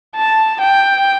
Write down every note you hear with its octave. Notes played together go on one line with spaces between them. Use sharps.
A5
G5